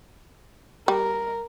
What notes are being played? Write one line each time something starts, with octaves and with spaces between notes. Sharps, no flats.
G3 A#4